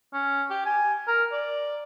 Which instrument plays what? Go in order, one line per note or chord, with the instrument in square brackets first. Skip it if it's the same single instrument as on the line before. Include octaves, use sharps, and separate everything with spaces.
[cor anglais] C#4
G4
G#5
A#4
D5